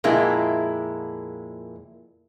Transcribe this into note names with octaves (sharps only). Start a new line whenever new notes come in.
F2 A#2 G#3 A#3 E4